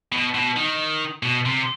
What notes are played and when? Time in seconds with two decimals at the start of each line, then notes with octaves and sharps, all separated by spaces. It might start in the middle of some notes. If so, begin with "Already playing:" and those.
0.12 B2
0.34 B2
0.56 D#3
1.23 B2
1.46 C3